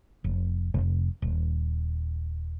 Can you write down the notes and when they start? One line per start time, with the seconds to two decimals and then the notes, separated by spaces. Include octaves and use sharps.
0.24 F1
0.74 F1
1.22 D#1